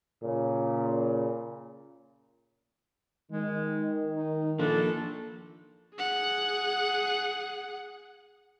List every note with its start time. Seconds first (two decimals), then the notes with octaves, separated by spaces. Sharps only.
0.23 A#2 C#3
3.32 D#3 G#3
4.14 D#4
4.59 F3 A#3 D4 A4
5.95 G#4 F#5